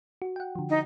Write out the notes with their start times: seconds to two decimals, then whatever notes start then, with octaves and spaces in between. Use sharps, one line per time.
0.22 F#4
0.36 F#5 G5
0.55 D3 F3
0.70 D#4